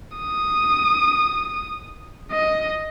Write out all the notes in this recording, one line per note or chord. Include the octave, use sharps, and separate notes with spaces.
D#6
D#5